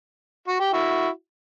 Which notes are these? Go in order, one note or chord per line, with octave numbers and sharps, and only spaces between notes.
F#4
G4
E4 F#4